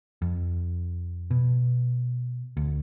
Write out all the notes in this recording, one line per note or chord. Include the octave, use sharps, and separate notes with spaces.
F2
B2
D2